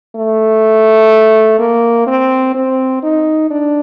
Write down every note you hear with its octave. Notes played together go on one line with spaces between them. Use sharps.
A3
A#3
C4
C4
D#4
D4